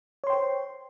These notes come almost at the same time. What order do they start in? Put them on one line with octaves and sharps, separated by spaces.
C#5 C6 G5 C5